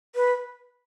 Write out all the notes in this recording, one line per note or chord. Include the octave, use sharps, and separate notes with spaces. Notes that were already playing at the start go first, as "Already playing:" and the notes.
B4